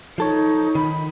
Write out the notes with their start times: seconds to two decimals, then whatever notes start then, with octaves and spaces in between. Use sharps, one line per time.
0.18 F3 D#4 A4 C#5
0.75 D#3 B5